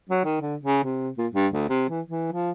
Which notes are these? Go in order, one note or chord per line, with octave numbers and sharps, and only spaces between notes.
F#3
D#3
D3
C#3
C3
A#2
G2
D2
C3
E3
E3
F3